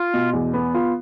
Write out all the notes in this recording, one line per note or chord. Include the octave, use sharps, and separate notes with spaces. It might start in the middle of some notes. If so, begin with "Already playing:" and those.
Already playing: F4
B2
E2
B3
F4